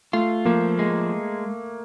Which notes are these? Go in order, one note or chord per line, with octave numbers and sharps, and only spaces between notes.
A3 F4
F3 A#3
G#3